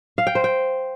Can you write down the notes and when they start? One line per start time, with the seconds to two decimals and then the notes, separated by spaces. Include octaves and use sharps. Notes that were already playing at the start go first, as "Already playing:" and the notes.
0.18 F5
0.27 G5
0.35 C5
0.44 G5